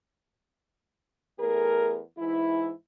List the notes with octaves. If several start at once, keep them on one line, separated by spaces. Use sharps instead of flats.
E2 A3 G#4 A#4
G#2 E3 E4